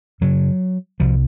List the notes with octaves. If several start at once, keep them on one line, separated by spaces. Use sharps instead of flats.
F#2 C#3 F#3
C2 C3 F3